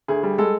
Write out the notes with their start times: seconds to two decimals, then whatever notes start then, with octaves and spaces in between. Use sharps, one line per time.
0.08 D2 G#4
0.23 G3
0.38 G#3 A4